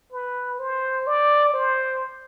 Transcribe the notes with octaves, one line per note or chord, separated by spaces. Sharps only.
B4
C5
D5
C5